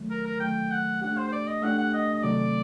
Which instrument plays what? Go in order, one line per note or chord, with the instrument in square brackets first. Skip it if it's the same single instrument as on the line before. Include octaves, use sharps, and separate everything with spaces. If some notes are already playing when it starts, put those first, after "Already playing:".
Already playing: [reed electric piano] D#3 F#3 A3
[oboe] A#4
A#4
[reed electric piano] D#3 F#3 A3 [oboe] G5
[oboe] F#5
[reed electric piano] A3 D4 G4 [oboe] F#5
[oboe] C5
C5
D5
D#5
[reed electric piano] A3 D4 G4 [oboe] F#5
[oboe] F#5
D#5
D#5
[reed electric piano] C3 D#3 F#3 A3 C4 [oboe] D5